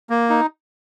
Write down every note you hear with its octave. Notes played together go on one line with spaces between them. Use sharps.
A#3
D#4